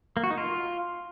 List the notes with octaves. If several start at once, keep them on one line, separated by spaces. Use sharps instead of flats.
A#3
F#4
D#4
F4